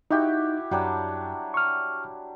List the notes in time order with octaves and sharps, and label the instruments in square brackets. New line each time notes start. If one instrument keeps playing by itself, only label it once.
[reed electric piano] D#4 [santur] E4 F#4 G4
[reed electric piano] F#2 [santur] F#3 G3 D4
[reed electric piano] C#6 F6